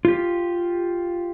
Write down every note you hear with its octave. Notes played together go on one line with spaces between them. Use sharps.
F4 G4